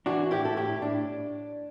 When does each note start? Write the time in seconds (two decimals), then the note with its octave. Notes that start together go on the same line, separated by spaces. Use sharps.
0.06 E3 D4 F#4
0.31 A2 E4 G4
0.45 A4
0.56 A2 E4 G4
0.82 A2 D4